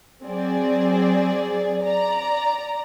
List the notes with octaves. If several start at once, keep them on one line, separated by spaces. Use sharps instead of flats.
F#3 C4 G#4 D5
D5 A#5